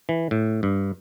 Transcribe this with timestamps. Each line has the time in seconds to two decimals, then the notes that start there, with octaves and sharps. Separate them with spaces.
0.09 E3
0.31 A2
0.63 G2